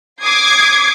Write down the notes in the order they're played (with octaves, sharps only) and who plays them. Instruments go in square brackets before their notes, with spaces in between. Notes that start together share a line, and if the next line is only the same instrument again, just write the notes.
[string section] D6 D#6 G#6 C7